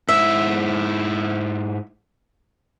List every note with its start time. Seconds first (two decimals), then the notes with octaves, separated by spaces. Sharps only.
0.09 G#2 E4 E5